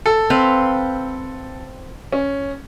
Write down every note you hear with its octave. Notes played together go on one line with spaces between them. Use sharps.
A4
C4 B4 F5
C#4